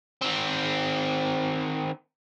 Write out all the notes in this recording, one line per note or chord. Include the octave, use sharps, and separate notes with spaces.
D#3 C4